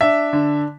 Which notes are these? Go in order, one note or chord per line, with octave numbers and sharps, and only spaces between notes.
D4 E5
D3